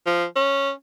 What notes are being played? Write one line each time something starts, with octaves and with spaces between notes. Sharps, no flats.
F3
C#4